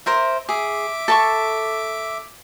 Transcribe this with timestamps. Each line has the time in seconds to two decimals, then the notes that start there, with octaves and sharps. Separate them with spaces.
0.06 A#4 C5 E5
0.49 G#4 E5 D6
1.08 A4 A5 C#6